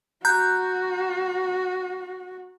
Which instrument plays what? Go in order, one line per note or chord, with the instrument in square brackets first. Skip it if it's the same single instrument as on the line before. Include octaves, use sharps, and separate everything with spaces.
[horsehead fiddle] F#4 [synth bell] A#5 F#6 G6